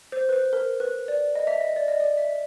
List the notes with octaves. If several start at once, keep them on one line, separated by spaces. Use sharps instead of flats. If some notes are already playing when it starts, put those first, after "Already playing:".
C5
B4
C5
A#4
B4
D5
D#5
E5
D#5
D5
D#5
D5
E5